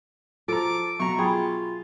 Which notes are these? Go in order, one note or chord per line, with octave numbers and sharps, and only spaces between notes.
F3 A4 A#5 D6
B2 F#3 A#5 C#6
F#3 F4 G#4 G5 B5